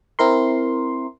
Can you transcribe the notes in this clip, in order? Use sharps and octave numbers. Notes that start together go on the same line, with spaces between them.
C4 E4 A#4 C6